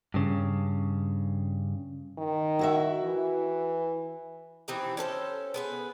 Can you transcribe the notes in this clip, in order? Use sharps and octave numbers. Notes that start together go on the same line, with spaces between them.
G2 C#3
D#3
E4 F#4 E5
E3
E3 C4 D#4 G4
C#4 A4 B4 C5
B3 G#4 B4